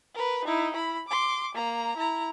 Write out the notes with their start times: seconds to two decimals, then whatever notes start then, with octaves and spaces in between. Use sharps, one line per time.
0.15 A#4 B4
0.45 D#4 E4
0.74 E4 B5
1.08 C6 D6
1.55 A#3 A#5
1.97 E4 A#5